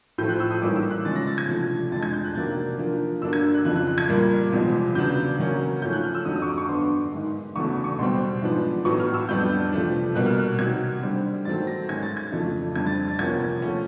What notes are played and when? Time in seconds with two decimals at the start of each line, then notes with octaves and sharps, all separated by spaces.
0.18 A2 F3 A3 C4 G6
0.29 F#6
0.40 E6
0.51 D#6
0.62 G#2 E3 G3 A#3 C#4 D6
0.76 E6
0.90 F#6
1.05 C#3 F3 G#3 C#4 A6
1.16 A#6
1.27 A6
1.38 G#6
1.48 C3 F3 A3 D4
1.92 F2 D3 F3 G#3 A6
2.03 G#6
2.13 G6
2.24 F#6
2.35 C3 D#3 F#3 A#3 D4 A6
2.78 D3 F3 A#3
3.22 G2 D3 F#3 A#3 D4 E6
3.33 G#6
3.54 F#6
3.65 F2 C#3 F3 F#6
3.76 F#6
3.87 F#6
3.98 G#6
4.08 A#2 G3 A#3
4.52 E2 C3 F3 G#3
4.95 C#3 F#3 B3 D4 G6
5.39 C#3 F#3 A#3 C#4
5.82 G#2 F3 A3 C#4 G6
5.93 F#6
6.03 F6
6.15 E6
6.25 F2 D3 F#3 D#6
6.36 D#6
6.42 C#6
6.47 D6
6.58 C#6
6.69 G2 D3 F#3 B3 C6
7.12 G#2 D#3 G#3
7.56 E2 C#3 F#3 A3 D4 C#6
7.84 C#6
7.98 B2 G3 C4 C6
8.42 G#2 F3 G#3 B3 D4
8.85 A2 F#3 B3 C#6
9.00 F6
9.14 E6
9.29 F2 D3 G3 B3 D4 G6
9.72 C3 F3 A3 D4
10.16 B2 G3 A#3 F#6
10.26 F6
10.37 F#6
10.59 C3 D#3 F#3 G#6
11.02 D3 G3 C4
11.45 G#2 D#3 F#3 A3 C4 A6
11.67 A#6
11.89 G#2 D#3 G#3 C#4 G#6
12.03 A6
12.17 G#6
12.32 F2 C#3 F3 A3 D4
12.76 F2 D3 G3 C4 G#6
12.86 A6
13.08 A6
13.19 E2 C3 F3 A#3 C#4 G#6
13.62 F3 A3 C#4